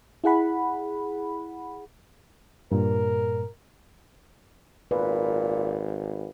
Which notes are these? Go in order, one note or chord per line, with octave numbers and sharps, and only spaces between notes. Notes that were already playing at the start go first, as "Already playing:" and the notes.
E4 G#4 F#5 B5
G2 A#2 A#4
G#1 A#2 B4